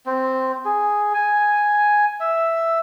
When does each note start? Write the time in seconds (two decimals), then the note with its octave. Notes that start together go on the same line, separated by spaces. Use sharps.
0.06 C4
0.65 G#4
1.14 G#5
2.20 E5